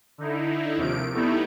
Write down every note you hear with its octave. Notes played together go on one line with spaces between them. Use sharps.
D3 D#4 E4
D#2 C3 F3 D7
G3 A3 B3 D#4 E4